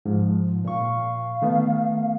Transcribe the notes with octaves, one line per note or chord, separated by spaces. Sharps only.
G#2 F3
A#2 F5 C#6
D#3 A3 B3